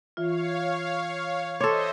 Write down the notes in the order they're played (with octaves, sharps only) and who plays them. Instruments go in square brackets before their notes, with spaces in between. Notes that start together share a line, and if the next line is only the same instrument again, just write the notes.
[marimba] E3 F4 [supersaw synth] C#5 F5
[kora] A4 C#5 [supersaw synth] C5 D#5 E5 [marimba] C6 D6